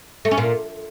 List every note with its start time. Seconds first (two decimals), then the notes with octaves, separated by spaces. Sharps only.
0.25 A3
0.31 C#4
0.38 A#2